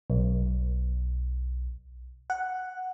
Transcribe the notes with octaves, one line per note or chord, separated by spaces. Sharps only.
B1
F#5